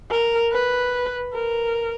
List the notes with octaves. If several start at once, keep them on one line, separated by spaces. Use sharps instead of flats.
A#4
B4
A#4